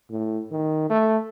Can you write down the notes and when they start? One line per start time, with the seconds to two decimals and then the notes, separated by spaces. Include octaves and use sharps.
0.11 A2
0.51 D#3
0.90 A3